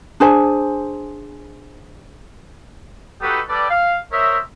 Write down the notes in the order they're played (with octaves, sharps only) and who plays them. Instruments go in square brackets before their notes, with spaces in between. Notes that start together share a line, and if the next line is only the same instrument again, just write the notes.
[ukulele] D4 G#4 C5 G#5
[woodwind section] D#4 F#4 G4 A4 B4
G3 G4 A4 B4 D5
F5
A#4 C5 C#5 D#5 E5